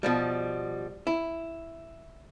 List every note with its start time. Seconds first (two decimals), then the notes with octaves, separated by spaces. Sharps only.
0.03 B2 F3 G3
1.07 E4